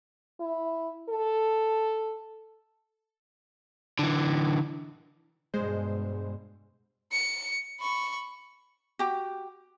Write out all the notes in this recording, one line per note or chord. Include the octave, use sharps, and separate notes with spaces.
E4
A4
D3 E3
G2 B2 G#3 C5
C#7
B5 C#6
F#4 G4